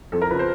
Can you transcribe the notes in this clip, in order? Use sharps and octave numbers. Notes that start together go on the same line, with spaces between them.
F2 A4
A#4
C#3 F3 B4
C5